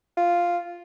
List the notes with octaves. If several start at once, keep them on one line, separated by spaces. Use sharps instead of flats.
F4